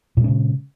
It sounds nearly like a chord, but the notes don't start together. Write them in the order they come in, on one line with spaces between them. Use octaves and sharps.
A#2 G#3 C#4 C#3